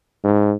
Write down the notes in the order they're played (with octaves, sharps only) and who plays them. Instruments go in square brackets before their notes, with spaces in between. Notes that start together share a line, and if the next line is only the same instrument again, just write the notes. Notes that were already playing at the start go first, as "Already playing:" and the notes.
[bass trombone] G#2